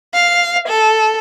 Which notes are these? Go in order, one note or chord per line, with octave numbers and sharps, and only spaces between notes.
F5
A4